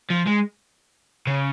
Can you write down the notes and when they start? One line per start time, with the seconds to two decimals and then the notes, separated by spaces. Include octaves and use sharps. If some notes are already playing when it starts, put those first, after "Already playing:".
0.10 F3
0.26 G#3
1.27 C#3